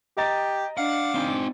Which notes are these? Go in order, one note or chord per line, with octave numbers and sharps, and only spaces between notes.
G4 D#5 A#5 A6
D4 F5 F#5 D6
C4 D#4